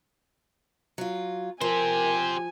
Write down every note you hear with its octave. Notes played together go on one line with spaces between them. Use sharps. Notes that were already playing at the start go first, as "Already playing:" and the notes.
F#3 F4
F3 G4 A#4 C5 G#5